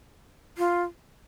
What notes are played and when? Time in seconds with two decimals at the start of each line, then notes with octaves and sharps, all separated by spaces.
0.58 F4